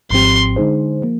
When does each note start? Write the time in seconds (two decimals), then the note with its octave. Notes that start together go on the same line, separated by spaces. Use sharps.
0.10 G#1 G#2 F3 C4 G4 C6
0.56 D3 G#3 D#4 G#4 C5
1.02 F3 A#3